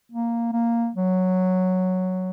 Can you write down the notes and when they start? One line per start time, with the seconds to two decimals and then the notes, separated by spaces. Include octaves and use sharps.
0.12 A#3
0.53 A#3
0.95 F#3